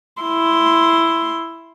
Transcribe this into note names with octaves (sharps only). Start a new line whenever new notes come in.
E4 C6